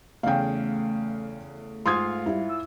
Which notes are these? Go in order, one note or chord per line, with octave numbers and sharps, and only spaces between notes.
E2 C#3 A3 F5 G5
G#2 F4 F5 C6 D#6 G#6
G3 E4
E6